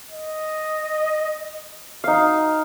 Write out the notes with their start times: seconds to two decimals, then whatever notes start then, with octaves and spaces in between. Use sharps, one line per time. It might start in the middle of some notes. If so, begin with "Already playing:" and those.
0.11 D#5
2.04 D#4 F#4 F5